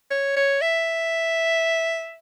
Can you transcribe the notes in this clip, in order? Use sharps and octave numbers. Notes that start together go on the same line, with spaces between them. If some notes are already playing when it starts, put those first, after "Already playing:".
C#5
C#5
E5